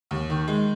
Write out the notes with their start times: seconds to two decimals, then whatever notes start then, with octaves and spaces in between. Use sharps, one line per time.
0.11 D#2
0.30 D#3
0.48 G#3